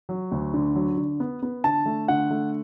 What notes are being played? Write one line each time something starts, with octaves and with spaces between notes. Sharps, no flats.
F#3
D2
D3
F#3
D3
B3
B3
D3 A5
A3
D3 F#5
A3